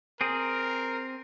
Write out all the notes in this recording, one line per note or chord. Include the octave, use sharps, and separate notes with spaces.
C4 G#4 A#4